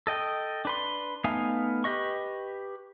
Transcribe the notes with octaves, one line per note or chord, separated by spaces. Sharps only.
A4 D#5 G5
D4 B4 C6
A3 B3 D#4 F5 G#5
G4 B4 D#5 C#6